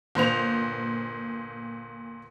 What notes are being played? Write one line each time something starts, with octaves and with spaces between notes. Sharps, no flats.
G1 A#2 C5 F7